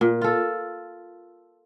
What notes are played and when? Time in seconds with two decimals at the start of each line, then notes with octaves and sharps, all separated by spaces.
0.01 A#2
0.21 F4 A4